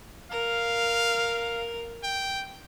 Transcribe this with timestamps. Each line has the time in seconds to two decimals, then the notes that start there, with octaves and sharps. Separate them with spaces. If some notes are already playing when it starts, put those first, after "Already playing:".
0.31 A#4 F5
2.04 G5